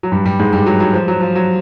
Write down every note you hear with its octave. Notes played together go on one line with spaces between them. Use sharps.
F#3
G2 G3
G2 G3
G#2 G#3
G2 G3
F#3
F#3
F3
F#3
F3
F#3